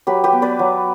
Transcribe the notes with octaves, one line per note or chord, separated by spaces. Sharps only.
F#3 G4 B4
G4 B4
B3
B4 D5
F#3